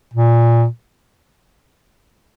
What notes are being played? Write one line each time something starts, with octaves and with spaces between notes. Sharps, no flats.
A#2